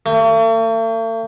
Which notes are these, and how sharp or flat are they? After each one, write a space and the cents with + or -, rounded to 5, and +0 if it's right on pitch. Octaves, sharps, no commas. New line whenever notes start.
A3 +45